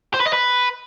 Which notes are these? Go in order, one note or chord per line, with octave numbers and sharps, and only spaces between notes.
C5
B4
D#5
B4